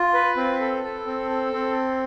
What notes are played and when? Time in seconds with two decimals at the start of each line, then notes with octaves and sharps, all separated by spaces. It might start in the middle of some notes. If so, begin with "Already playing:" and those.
Already playing: F4
0.14 B4
0.37 C4
0.60 A4
0.83 A4
1.06 C4
1.29 A4
1.53 C4